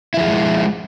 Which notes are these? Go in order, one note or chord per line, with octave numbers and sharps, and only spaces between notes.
F3 G#3 E4 F4 G#4